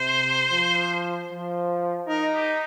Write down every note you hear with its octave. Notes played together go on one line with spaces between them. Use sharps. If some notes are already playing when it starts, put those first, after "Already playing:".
Already playing: C3 C5
F3
F3
D#4 A#4
G4